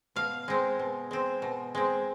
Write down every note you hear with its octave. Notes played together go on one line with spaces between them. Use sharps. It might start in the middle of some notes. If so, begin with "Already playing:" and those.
B2 F5
G#3 C4
B2
G#3 C4
B2
G#3 C4